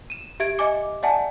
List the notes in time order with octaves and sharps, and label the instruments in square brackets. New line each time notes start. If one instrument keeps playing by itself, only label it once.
[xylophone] D#7 E7
G4 E5 G#6 D7
D#5 E5 G#5 D6 C#7
D5 E5 F#5 G#5 A5